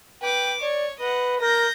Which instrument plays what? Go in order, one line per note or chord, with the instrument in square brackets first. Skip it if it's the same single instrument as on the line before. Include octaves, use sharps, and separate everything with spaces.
[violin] B4 D6 [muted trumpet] G5
[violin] C#5 [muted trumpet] D5
[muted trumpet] B4 [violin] D#5 F#5
[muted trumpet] A#4 [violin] G6 A#6